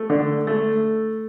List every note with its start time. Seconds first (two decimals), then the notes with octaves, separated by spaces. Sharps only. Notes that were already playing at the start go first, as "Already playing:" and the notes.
Already playing: A3
0.10 D3
0.47 A3